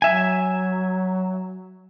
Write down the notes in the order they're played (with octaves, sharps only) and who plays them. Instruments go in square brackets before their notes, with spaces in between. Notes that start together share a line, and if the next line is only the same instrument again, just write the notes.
[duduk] F#3 [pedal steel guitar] E5 G#5